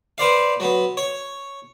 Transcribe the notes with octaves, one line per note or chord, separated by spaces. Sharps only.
B4 C5 D5 F5
F#3 B3
C#5